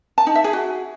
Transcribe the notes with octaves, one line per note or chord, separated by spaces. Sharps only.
A5
D#4
E5
G#4
F#4